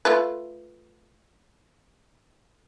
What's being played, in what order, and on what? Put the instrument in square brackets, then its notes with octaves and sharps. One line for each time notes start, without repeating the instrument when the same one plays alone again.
[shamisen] A3 F4 B4